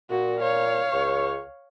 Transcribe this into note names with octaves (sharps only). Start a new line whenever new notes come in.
A#2 F#4
C#5 F5
C#2 C#6